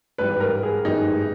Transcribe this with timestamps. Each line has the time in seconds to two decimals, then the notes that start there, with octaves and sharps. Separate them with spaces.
0.18 G#2 E3 G3 B4
0.40 A#4
0.63 G#4
0.85 G#2 E3 G3 D#4